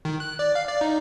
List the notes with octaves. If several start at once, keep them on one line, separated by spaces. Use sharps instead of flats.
D#3
F#6
D5
F5
D5
D#4